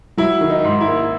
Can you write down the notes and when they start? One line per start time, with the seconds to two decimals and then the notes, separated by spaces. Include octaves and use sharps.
0.18 F#3 E4
0.41 D#3
0.50 D#4
0.64 G#2
0.81 E4
0.88 A#3